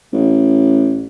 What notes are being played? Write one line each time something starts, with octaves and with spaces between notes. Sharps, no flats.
A1